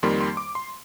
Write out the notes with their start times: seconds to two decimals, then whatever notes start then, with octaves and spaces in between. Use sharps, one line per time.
0.03 F2 D#3 G3 A#3 C6
0.21 C6
0.37 D6
0.55 C6